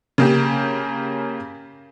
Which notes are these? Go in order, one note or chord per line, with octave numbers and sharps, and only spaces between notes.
C#3 A#3 G4